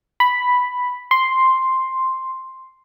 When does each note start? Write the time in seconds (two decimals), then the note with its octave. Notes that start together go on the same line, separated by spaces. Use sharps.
0.20 B5
1.11 C6